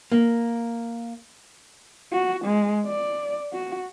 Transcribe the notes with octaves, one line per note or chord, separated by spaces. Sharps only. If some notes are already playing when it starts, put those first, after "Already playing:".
A#3
F#4
G#3
D5
F#4